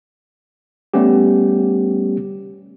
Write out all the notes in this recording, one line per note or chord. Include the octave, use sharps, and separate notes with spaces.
G3 A3 B3 C#4 G4